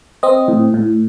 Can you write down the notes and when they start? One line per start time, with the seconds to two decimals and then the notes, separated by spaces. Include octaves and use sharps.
0.23 C4 D#5
0.48 A2
0.74 A2